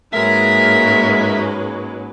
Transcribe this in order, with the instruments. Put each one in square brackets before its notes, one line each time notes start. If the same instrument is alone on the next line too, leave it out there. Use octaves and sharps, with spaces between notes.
[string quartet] G#2 F#3 B4 [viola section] G#3 A#3 C#4 [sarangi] A#4 [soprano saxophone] E5